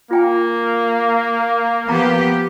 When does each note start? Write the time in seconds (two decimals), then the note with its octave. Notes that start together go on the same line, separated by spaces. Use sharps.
0.11 A#3 F4 G5 G#5
1.88 F3 B3 G4 A#5